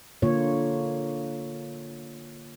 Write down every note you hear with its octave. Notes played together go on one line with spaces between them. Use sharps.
D3 A#3 F4 C#5